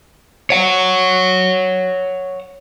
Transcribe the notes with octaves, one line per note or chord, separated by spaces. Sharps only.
C#5 F#5